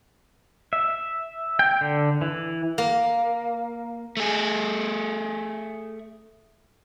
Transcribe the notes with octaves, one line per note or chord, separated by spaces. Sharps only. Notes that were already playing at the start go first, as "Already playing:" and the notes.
E5
G5
D3
E3
A#3
A3 G#4